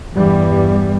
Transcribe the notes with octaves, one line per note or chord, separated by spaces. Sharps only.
E2 G2 E3 G3 B3